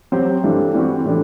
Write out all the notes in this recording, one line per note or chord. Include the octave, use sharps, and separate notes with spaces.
F#3 C4 G4 C5
G2 E3 G3 D4 A4
E3 G3 C4 F#4
A2 E3 A3 D4